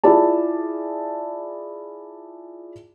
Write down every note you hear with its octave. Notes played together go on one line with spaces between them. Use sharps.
E4 F4 G#4 D5 A5